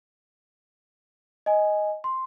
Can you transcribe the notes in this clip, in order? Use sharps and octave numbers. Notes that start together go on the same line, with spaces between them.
D#5 G#5
C6